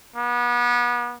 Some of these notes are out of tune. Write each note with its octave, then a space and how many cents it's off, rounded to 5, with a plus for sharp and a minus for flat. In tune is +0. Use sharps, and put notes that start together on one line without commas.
B3 -35